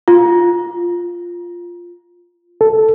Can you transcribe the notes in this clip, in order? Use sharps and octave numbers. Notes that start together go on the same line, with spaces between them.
F4
A4